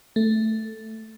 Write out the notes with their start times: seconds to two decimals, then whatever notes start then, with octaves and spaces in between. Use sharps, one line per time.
0.16 A3